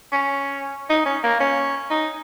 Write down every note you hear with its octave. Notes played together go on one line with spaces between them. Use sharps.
C#4
D#4
C#4
A#3
C#4
D#4